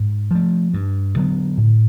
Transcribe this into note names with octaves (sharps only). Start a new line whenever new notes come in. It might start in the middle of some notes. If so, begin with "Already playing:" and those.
Already playing: G#2
F3 A3
G2
D3 F#3 B3
A2